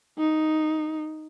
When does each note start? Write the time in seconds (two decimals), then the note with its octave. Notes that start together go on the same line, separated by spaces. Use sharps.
0.19 D#4